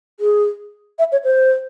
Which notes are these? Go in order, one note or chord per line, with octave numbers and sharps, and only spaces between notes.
G#4
E5
C#5
C5